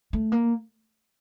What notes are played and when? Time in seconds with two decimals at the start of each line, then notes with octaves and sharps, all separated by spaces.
0.13 A3
0.32 A#3